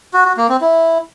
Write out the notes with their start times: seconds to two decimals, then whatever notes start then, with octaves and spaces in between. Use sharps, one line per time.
0.14 F#4
0.25 F#4
0.37 A#3
0.49 C4
0.61 E4